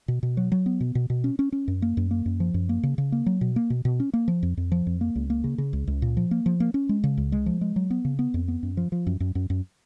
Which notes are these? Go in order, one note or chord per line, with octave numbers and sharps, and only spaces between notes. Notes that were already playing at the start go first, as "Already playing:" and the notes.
B2
B2
F#3
F#3
B3
B2
B2
B2
C#4
C#4
C#4
F#2
A#3
F#2
A#3
F#2
F3
F#2
A#3
C#3
C#3
A#3
F#3
B2
A#3
B2
B2
C#4
A#3
F3
F2
F2
F3
F2
A#3
C#2
A#3
C#3
C#3
C#2
C#2
A#2
F3
A#3
F3
A#3
C#4
G#3
C#3
C#2
G#3
F3
G#3
F#3
B3
C#3
B3
F2
B3
F#2
F3
F3
F#2
F#2
F#2
F#2